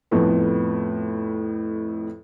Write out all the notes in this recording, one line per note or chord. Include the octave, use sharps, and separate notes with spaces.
F2 A2 B3